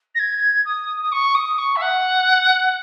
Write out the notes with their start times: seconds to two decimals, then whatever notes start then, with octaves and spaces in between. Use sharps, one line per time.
0.15 A#6
0.19 G#6
0.65 D#6
1.02 D#6
1.12 C#6
1.35 D#6
1.58 C#6
1.76 E5
1.81 F#5